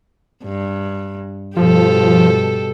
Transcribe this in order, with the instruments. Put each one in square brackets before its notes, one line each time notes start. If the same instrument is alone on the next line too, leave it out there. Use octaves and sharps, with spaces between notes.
[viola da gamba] G2
[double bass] G2 B2 [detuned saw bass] F3 [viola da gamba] G4 A4